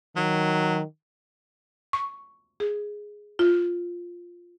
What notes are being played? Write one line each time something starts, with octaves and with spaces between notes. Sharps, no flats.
D#3 F#3
C#6
G#4
F4